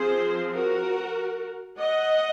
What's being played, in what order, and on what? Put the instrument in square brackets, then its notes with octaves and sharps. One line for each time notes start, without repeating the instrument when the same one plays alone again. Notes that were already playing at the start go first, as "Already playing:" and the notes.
Already playing: [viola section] F3 C4 G#4 C5
F#4 A#4
D#5 F#5